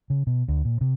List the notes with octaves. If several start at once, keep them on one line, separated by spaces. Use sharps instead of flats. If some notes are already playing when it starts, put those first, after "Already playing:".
C#3
B2
D2
A#2
C3